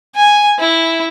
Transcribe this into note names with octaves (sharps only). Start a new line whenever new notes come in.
G#5
E4